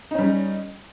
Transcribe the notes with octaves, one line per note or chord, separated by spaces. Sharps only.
G3 C#4 D#4